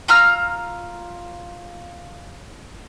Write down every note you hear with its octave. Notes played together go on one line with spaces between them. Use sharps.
F4 A#5 E6 F6